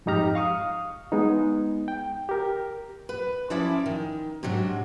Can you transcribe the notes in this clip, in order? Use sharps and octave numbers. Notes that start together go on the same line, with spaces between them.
F2 G#2 D#4 G4 A#5 F6
F5 C#6 D#6
G#3 B3 D#4
G5
G4 A#4
B4
F3 C#4 E4 D5 E5
D#3
G#2 C3 F#3 D4